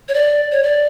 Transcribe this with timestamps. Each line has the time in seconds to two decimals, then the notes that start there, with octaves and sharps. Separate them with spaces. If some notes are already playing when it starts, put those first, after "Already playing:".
0.09 C#5
0.14 D5
0.52 C#5
0.63 D5